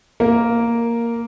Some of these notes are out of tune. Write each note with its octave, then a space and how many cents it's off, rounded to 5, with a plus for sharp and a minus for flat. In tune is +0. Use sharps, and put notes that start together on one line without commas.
A#3 +0 A#4 +0